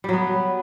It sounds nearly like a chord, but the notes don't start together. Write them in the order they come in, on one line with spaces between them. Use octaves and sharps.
G3 F#3 B3